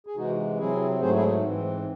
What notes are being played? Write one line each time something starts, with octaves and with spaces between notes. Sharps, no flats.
G#4
C3 E3 G#3 D#4 F#4
C3 F#3 C4 E4 G#4
G#2 F#3 A3 G#4 C5
F#4
E4 G#4
G#2 E3 C4